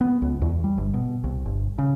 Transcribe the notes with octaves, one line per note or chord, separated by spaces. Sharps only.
B3
C#2
E2
G3
G1
B2
C2
G1
C#3